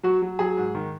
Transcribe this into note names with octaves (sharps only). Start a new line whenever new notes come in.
F#3 F#4
F#3
F#3 G#4
G#2
D#3